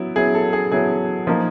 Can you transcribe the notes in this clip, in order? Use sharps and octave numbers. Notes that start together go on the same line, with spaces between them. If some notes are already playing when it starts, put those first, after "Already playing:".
Already playing: F#3 B3 E4
F#3 B3 E4 G#4
A4
G#4
F#3 B3 E4 G#4
F3 A#3 D#4